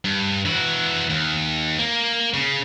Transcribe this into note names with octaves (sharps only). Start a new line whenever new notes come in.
G2
E3 F#4
D#2
A#3
C#3